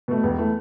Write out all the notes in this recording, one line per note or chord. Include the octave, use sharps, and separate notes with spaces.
B2 A3
E1 B3
E3 A3